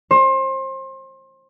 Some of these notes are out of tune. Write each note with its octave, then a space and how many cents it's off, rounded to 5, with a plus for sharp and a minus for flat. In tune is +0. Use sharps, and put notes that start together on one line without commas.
C5 +30